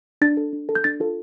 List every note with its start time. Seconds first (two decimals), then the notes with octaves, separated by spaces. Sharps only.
0.22 D4 A6
0.37 A4
0.53 D4
0.69 A4
0.75 G6
0.84 D4 A6
1.00 F4 A4